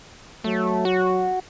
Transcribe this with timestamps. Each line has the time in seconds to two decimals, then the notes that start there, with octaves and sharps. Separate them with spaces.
0.44 F#3 A3
0.85 F#4